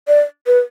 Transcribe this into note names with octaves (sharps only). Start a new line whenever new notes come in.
D5
B4